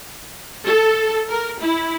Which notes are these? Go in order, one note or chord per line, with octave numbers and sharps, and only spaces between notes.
A4
A#4
E4